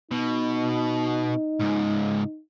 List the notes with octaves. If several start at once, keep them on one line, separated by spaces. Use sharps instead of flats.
B2 D#4
C#2 G#2